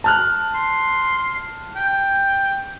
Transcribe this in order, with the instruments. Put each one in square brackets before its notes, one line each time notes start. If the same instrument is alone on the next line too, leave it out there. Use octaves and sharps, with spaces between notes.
[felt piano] A5 F6 F#6
[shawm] C6
G5